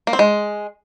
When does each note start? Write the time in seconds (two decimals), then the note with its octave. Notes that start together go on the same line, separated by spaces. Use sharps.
0.07 A#3
0.13 C4
0.19 G#3